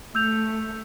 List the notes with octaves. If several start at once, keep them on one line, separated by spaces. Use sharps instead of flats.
A3 E6 G6 F7